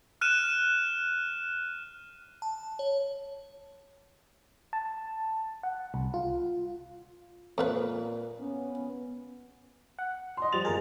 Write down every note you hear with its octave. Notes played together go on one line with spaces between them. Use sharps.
F6 F#6 D#7 E7
A5
C#5
A5
F#5
C2
F4
F2 A#2 A#3 F4 B4
B3 C#4
F#5
D#5 C6
F3 G3 A6 F7
G1 G#4 A#4 A6